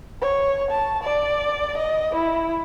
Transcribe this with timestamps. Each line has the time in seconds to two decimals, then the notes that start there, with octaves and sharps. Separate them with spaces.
0.21 C#5
0.71 A5
1.03 D5
1.77 D#5
2.15 E4